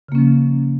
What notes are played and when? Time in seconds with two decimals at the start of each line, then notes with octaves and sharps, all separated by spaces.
0.09 C#3
0.12 A#3
0.15 C#4
0.18 F3